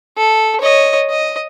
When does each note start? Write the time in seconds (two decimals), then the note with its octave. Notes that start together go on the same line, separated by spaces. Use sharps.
0.17 A4
0.61 C#5 D#5
1.09 D#5